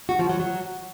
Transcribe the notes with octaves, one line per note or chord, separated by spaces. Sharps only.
F#4
F3
F#3
F#3